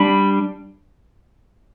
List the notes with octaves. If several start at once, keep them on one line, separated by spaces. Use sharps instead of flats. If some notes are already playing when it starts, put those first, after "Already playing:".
Already playing: G3 D4 B5